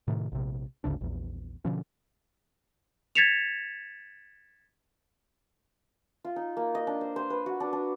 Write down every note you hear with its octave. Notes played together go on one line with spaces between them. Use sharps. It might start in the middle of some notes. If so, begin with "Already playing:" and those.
A2 C3 D#3
A#1 C3
G#1 D2 C#3 D4
A#1 E2
B2 D3 F3 C#4
G#6 A6 B6 C#7 E7 F7
F4
D#4
A#3
D#5
D4
C5
C5
B4
F#4
D4
D4